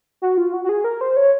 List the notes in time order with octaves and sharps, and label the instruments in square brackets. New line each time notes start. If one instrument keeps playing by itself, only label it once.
[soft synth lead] F#4
F4
F#4
F#4
G#4
A#4
C5
C#5